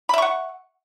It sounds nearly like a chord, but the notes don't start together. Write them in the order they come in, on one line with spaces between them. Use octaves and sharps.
B5 E5 C#6 F#5